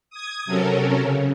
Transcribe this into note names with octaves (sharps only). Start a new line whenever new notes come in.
D#6 G#6
C3 F#3 C#4 A4 A#4
C#3